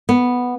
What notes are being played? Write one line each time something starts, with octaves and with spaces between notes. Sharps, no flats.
B3